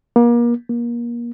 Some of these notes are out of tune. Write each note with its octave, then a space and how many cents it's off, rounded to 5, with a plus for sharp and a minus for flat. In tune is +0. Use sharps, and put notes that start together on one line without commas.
A#3 +35
A#3 +30